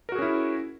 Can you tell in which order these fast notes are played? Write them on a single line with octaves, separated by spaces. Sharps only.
A#4 F#4 G#4 C#4 E4